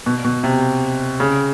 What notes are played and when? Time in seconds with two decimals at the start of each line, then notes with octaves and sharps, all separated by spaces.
0.06 B2
0.24 B2
0.44 C3
1.20 C#3